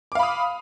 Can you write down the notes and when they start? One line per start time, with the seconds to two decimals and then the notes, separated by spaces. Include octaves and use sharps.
0.12 D6
0.15 F5
0.19 B5
0.23 D#6